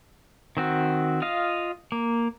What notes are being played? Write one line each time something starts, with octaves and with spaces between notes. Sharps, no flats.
D#3 C4 F#4
F4 D#5 F5
A#3